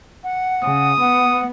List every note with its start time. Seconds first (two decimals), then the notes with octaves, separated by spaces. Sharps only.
0.24 F#5
0.63 C#3 D#6
1.01 B3 F#5